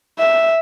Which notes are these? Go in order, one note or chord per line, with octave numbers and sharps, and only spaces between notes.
E5